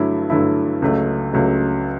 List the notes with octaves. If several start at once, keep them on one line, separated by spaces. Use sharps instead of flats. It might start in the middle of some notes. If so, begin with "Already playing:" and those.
Already playing: G2 D3 F#3 A3 E4
G2 D3 F#3 A3 E4
C#2 C#3 F#3 A3
C#2 C#3 F#3 A3